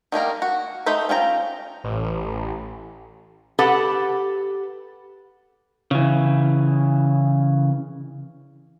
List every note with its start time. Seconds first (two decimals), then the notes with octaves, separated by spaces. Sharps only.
0.12 D#3 G3 A#3 A#4
0.42 F#4
0.86 A3 D#4 C5 B5
1.09 C#4 F4 G5 A#5
1.84 A1
3.59 G4 A4 B4 F#5
5.91 C#3 E3